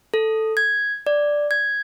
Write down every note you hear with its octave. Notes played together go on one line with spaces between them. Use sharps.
A4
G#6
D5
G#6